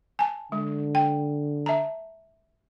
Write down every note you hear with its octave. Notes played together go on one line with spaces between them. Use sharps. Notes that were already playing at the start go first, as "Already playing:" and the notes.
G#5 A5
D3 G#3
G5
E5 A5 A#5